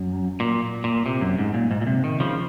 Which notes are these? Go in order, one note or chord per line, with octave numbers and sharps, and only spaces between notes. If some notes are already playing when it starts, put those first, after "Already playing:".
Already playing: F#2
A#2
A#2
C3
F#2
G#2
A#2
G#2
A#2
C3
D#3
C#3 F3